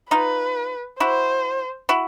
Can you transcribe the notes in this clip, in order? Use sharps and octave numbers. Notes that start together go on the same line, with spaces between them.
D#4 F4 B4
E4 F#4 C5
E4 F#4